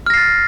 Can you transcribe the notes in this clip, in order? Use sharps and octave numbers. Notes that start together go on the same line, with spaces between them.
F6 A6 A#6 C7